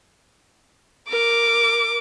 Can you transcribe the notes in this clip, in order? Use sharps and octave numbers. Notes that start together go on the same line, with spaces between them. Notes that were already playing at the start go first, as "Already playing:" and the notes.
A#4 D6